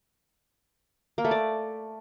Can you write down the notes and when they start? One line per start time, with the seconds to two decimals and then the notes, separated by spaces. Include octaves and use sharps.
1.18 A#3
1.25 A3
1.31 D5